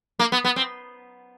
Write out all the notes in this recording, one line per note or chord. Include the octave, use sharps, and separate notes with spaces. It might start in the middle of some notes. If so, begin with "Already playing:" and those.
A#3
B3
B3
C4